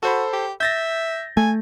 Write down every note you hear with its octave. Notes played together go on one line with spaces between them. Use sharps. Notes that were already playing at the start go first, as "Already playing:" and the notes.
F#4 A4 C5 B5
G4
E5 G6 A6 A#6
A3 G#5